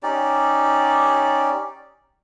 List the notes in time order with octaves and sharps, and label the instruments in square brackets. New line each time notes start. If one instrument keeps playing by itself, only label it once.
[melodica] C#4 D#4 G4 D5